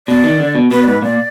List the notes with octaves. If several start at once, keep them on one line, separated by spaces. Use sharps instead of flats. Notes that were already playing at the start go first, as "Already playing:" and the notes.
B2 D5
D#3
D3
B2
B2 B4
D5
G#2 B4
A#2 D5